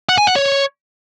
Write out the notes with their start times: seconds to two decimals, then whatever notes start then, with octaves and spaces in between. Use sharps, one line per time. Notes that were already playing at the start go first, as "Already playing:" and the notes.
0.09 F#5
0.18 G#5
0.27 F#5
0.36 C#5